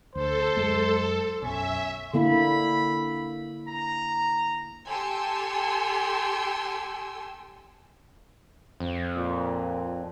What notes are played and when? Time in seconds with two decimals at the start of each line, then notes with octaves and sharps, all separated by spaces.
0.15 D2 A4 C5
0.57 F#2 G#3
1.42 B1 F#2 C#4 E5
2.14 D3 A#3 E4 B5
3.69 A#5
4.88 G4 A4 G5 G#5 C6 E6
8.80 F2
9.17 A#2